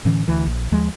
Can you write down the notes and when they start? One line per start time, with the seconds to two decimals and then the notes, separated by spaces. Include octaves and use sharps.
0.05 A2 D3 E3 C#4
0.28 D2 E3
0.46 A#1
0.72 D#2 F3 G#3